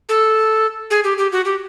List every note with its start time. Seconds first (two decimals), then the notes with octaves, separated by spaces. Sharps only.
0.09 A4
0.90 G#4
1.04 G4
1.18 G4
1.32 F#4
1.45 G4